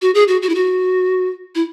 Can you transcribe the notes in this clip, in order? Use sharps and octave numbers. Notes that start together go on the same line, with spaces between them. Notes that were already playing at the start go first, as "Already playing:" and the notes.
F#4
G#4
F#4
F#4
E4
F#4
E4